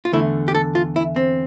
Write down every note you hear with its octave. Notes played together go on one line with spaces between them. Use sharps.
F4
E2 D3 A3 E4
G4
A4
F4
E4
C4